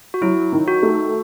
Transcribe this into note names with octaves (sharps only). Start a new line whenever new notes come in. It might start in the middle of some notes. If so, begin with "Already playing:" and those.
F#4
F#3 E4
D#3
F#4
A3